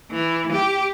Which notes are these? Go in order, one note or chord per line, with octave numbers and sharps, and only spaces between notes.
E3
G4